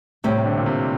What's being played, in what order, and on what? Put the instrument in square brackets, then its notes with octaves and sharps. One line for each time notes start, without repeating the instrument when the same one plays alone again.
[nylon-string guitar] A2 G3 C4 G4 [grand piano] C3
[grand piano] C3
D3
A#2
C3